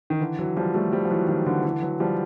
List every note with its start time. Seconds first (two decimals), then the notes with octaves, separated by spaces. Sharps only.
0.10 D#3
0.20 D3 E3
0.39 E3 F#3
0.57 F3 G3
0.74 G3 A3
0.92 F3 G3
1.05 F3
1.10 E3 F#3
1.28 D#3 F3
1.46 D3 E3
1.64 D3 E3
1.82 E3 F#3
2.00 F3 G3